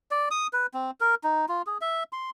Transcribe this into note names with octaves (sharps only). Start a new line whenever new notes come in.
D5
D#6
B4
C4
A#4
D#4
F4
G#4
E5
C6